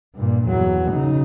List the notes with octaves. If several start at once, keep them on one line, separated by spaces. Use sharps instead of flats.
G2 A#2
E2 F#3
C#3 D#4